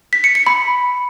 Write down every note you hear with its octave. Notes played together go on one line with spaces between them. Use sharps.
B6
C#7
C#7
B5